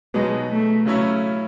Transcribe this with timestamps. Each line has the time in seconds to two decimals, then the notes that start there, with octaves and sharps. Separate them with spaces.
0.14 B2 F#3 G#3 B3 D#4
0.50 A3
0.86 C#3 F#3 A3 C#4 E4